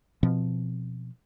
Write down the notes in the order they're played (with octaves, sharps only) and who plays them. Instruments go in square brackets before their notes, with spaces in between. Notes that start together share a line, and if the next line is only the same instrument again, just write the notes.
[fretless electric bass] B2 F3 C4